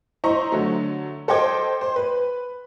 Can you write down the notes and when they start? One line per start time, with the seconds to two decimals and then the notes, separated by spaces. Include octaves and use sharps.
0.24 E4 C5 D#5 A#5 C#6
0.52 D3 F#3 A3
1.28 A4 C5 D#5 G5 D6 G#6
1.81 C5
1.96 B4